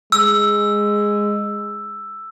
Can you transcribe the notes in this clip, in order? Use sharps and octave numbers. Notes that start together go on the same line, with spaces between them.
G#3 E6